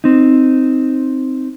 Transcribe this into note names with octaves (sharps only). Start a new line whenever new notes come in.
C4 D#4